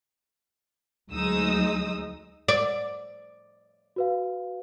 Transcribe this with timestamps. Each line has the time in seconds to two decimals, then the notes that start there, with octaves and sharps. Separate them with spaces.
1.11 D2 F#3 G#3 D#4 D#6 E6
2.48 D5
3.96 F#4 B4 F5